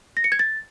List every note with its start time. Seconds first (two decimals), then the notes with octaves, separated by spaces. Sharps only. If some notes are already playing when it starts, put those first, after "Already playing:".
0.17 A#6
0.24 C#7
0.32 G#6
0.39 A6